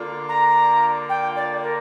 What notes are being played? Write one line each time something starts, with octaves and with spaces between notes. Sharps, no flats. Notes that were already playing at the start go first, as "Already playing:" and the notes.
Already playing: D3 A#3 D4 F4
A#5
G5
D5
A#4